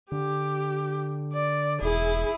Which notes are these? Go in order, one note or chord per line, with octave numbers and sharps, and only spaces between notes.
D3 G4
D5
E1 E4 G#4